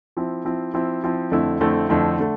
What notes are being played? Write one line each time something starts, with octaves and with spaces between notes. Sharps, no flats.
F3 C4 E4
F3 C4 E4
F3 C4 E4
F3 C4 E4
F2 D3 A3 C4 E4
F2 D3 A3 C4 E4
F2 D3 A3 C4 E4
D3 A3